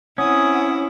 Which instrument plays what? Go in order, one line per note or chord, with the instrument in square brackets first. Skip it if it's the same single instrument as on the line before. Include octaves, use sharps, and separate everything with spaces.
[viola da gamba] C4 E4 [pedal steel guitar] C#4 [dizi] F#5 [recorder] D#6